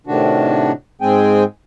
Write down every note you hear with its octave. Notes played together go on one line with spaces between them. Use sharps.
A2 C3 D#3 D4 F#4
G#2 G#3 C4 G#4 G5 G#5